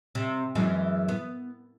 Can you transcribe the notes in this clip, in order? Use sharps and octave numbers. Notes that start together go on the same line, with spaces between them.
C3
F#2 E3 G#3
B3